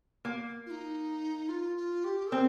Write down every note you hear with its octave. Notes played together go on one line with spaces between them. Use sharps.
A#3
F4
D#4
F4
F4
G4
C4 A#4